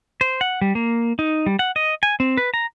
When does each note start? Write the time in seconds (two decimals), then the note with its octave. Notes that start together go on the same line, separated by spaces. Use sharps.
0.21 C5
0.41 F#5
0.61 G3
0.75 A#3
1.19 D#4
1.46 G3
1.59 F#5
1.76 D#5
2.03 G#5
2.20 C4
2.37 B4
2.54 A#5